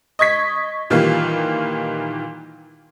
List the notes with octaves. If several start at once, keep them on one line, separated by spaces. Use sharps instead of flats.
D#5 C#6 G#6 B6
A#2 D#3 E3 G3 A#3 F4